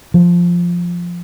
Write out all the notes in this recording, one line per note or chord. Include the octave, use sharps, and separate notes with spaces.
F3